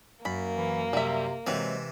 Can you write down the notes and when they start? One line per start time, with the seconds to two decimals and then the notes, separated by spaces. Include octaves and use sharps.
0.25 F#2 A#3 B5
0.56 E3
0.93 C3 G3 E5
1.47 C3 E3 F#3 G#3 C4